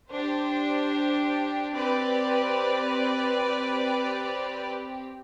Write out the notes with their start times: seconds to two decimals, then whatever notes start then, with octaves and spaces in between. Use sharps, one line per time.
0.10 D4 G4 C5
1.74 C4 G4 B4 D5
3.39 C4 G4